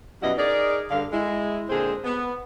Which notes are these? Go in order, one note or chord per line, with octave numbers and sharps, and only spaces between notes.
F#2 B2 G3 E4 D#5 F#5
D#4 G#4 A#4 D5
G2 D3 F5
G#3 E4
A#2 D3 G#3 C4 G#4 C5
B3